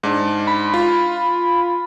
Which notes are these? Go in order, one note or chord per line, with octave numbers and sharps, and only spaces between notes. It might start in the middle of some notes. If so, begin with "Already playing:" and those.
G#2 D4
B5
F4